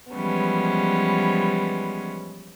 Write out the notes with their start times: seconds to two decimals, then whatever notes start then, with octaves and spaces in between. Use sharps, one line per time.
0.14 E3 F3 G3 G#3 B3 C#4